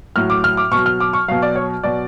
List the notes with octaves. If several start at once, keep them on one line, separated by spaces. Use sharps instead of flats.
A2 F#3 F6
D6
F6
D6
B2 F#3 C#6
F6
D6
C#6
B2 F#3 F5
D5
C#5
B2 F#3 D5